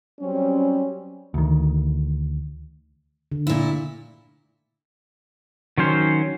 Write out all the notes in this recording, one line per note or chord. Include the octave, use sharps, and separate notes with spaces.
F#3 G3 C4 C#4
D2 D#3
D3
A#2 E4
D#3 F#3 C#4 C5